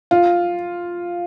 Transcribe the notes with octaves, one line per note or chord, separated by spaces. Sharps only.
F4